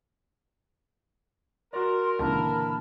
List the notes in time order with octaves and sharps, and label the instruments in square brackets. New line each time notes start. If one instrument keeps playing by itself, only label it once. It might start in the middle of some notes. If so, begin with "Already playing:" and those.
[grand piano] F#4 D5 [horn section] A#4 [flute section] C6
[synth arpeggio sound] C#2 [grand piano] A#2 D3 E3 [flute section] A5 B5 F6